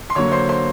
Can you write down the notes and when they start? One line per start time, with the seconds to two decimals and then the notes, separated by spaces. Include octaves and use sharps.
0.10 C6
0.15 D3 F#3 A#3 C#5 C#6
0.31 C5 C6
0.49 C5 C6